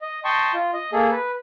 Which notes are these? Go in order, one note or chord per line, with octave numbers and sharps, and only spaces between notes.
D#5
D#5 G5 A5 C6 C#6
F4
D#5
A#3 G#4 A4
B4